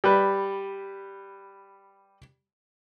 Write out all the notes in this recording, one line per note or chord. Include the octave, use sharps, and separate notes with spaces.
G3 B4